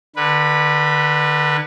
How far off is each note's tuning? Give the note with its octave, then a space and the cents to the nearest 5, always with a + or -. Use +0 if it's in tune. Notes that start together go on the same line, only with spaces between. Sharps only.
D3 +30 B4 -15